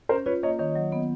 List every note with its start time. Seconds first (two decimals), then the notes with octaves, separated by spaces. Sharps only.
0.09 C#4 A#4 C5
0.26 F4 B4 C#5
0.43 A#3 C#5 D#5
0.59 D#3 C#5 D#5
0.76 F#3
0.92 B3